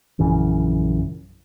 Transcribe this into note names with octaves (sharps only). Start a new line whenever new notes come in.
A#1 F#2 C#3 E3